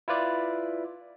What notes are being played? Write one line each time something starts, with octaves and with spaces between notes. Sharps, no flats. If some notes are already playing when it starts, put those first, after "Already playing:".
E4 F4 B4 D5